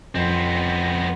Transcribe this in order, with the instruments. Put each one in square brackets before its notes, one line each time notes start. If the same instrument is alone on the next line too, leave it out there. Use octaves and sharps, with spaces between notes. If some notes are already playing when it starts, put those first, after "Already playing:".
[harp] F2 [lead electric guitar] B3 C4